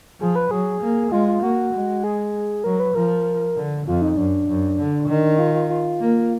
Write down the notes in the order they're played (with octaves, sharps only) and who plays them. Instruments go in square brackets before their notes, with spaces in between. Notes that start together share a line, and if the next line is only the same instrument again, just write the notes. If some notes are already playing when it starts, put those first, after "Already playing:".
[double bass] F3 [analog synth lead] G#4
[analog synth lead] B4
[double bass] F#3 [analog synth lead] G#4
[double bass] A#3
[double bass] G#3 [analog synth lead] F4
[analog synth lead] F4
[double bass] A#3 [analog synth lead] F#4
[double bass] G#3
[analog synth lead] G#4
[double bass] F#3 [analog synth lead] A#4
[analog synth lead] B4
[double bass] F3 [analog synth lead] A#4
[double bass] D3
[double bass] F2 [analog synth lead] F4
[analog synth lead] D#4
[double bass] F#2 [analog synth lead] D4
[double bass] F#2
D3
D#3
[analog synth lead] F4
F4
F4
[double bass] A#3